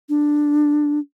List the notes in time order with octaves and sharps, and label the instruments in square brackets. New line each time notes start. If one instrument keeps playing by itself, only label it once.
[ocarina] D4